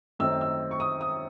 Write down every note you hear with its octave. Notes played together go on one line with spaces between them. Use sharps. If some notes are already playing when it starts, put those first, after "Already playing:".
F#2 D#3 A3 C4 E6
E6
C#6
D#6
D#6